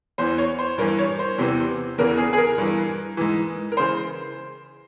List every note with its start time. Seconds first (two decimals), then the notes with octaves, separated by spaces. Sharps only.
0.18 E2 E3 C5
0.38 C#5
0.59 C5
0.78 G2 E3 A#4
0.99 C#5
1.19 C5
1.38 E2 C3 E3
1.98 E2 C#3 E3 A#4
2.17 G#4
2.33 G#4
2.38 A#4
2.58 G2 E3
3.17 G#2 E3
3.72 A#4
3.77 C#3 E3 C5